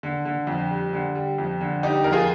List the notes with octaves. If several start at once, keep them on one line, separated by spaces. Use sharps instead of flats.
D3
D3
F2
G3
D3
G3
F2
D3
G3 D#4 G4
F2 A#4
F4 G#4